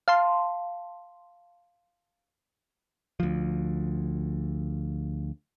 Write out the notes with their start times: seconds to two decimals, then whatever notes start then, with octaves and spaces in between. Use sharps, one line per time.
0.08 F5 A5 C6
3.20 D2 F3